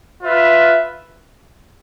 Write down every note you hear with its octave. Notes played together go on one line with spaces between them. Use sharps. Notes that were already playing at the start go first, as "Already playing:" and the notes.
F4 B4 E5